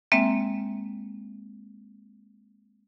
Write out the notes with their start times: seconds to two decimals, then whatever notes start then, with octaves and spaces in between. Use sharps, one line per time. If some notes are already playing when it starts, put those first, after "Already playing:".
0.12 G#3 A#3 C4 E5 G5